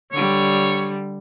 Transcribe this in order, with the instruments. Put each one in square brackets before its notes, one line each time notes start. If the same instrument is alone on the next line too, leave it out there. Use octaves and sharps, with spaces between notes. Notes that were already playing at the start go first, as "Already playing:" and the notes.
[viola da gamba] D3 G3 [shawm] C#5